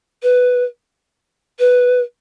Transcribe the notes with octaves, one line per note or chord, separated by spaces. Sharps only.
B4
B4